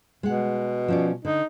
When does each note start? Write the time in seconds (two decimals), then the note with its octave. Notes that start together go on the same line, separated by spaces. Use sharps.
0.23 B2 G#3 F#5
0.88 F3 C#4 D5
1.25 D3 D#4